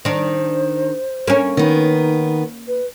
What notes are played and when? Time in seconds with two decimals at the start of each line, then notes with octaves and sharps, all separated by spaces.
0.05 D#3 D4 C5
1.28 A#3 C#4
1.57 D#3 B3 D#4
2.67 B4